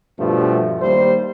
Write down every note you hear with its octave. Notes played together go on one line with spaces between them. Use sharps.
G2 B2 F3 A3
D#2 G3 C5